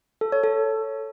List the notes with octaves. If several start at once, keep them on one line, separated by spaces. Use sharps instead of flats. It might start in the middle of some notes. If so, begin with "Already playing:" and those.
A4
C#5
A4